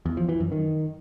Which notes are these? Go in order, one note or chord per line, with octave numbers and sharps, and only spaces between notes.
E2
F3
E3
F#2
D#3